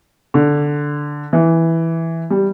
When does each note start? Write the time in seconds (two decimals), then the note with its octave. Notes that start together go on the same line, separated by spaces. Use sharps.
0.34 D3
1.33 E3
2.30 G3